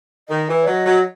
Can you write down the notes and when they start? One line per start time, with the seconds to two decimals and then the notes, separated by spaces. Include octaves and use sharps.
0.29 D#3 D#5
0.48 E3
0.62 C#5
0.67 F#3 D#5
0.85 F#3